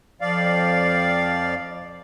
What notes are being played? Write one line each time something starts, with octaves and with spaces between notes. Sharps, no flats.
F2 F3 D5 F5